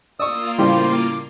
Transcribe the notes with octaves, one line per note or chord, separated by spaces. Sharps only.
A#3 F4 D5 C#6 D#6 E6
A2 C#3 G3 G4 C5 C6
D6